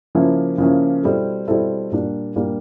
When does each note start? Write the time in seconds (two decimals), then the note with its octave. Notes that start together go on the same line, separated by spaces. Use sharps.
0.15 C#3 F3 A#3 C#4 E4
0.58 C#3 F3 A#3 C#4 E4
1.03 B2 G3 C4 E4 A4
1.48 B2 G3 C4 E4 A4
1.92 A#2 G3 A#3 D4
2.36 A#2 G3 A#3 D4